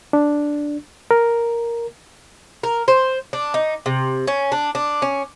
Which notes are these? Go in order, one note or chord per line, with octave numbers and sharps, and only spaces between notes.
D4
A#4
A#4
C5
D4
D#4
C3
C#4
D4
D4
C#4